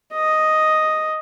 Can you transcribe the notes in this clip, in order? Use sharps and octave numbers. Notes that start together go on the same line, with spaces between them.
D#5